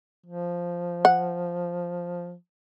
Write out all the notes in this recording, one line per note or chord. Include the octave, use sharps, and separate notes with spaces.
F3
F#5